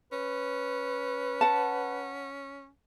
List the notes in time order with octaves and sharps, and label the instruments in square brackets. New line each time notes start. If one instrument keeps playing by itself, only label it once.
[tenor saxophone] C#4 [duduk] B4
[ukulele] F#5 A5